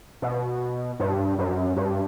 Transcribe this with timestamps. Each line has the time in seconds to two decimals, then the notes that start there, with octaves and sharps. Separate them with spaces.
0.22 B2
0.99 G2
1.38 F#2
1.76 G2